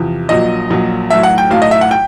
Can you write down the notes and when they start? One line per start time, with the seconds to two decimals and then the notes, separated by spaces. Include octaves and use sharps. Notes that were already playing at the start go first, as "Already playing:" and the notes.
Already playing: E2 C3 F3
0.29 A#1 A#2 F#3 D#5
0.70 A#1 A#2 F#3
1.10 B1 A2 F#3 E5
1.23 F#5
1.38 G5
1.50 B1 A2 F#3 F5
1.62 D#5
1.71 E5
1.81 F#5
1.91 G5